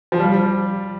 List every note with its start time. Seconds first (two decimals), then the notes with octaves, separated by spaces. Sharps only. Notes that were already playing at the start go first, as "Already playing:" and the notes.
0.12 F3
0.20 G3